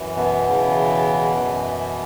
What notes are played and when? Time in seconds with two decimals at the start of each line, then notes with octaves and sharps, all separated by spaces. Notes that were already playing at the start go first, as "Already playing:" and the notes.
Already playing: F#2 E3
0.16 B2 B3
0.46 E2 C#3 E3
1.34 F#2 E3